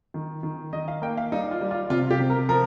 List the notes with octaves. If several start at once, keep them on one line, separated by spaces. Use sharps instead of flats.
D#3
D#3
D#3 D#5
F5
A#3 G5
F5
G3 D#4
F4
G3
F4
C3 F4
G4
C3
A#4
F3 A#4